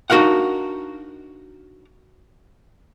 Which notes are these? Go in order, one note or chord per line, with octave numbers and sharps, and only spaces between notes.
D4 D#4 F#4 A#4 F5 F#5